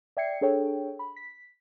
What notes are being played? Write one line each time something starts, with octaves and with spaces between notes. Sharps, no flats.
D5 E5 G5 G#6 C7 C#7
D4 G#4 A4 C#5 G5
B5
B6